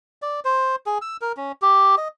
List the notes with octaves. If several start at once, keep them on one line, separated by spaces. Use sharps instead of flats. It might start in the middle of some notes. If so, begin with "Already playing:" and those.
D5
C5
G#4
E6
A#4
C#4
G4
D#5